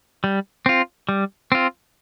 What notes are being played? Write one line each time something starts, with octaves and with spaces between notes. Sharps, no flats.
G3
C4 F4
G3
C4 F4